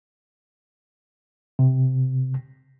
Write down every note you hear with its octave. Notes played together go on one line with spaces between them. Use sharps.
C3